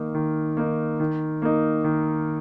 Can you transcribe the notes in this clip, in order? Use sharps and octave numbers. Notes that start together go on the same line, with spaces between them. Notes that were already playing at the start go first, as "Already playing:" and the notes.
Already playing: D#3 A#3 D#4
D#3
A#3 D#4
D#3
A#3 D#4
D#3